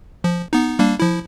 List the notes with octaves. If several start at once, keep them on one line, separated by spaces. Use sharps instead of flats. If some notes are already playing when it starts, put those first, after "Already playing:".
F3
B3 D#4
G3 A#3 D4
F3 E4